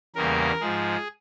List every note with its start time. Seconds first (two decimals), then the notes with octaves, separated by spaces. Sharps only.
0.15 E2 C#3 G3 A#3 A#4
0.61 G#2 F3 G#3 G#4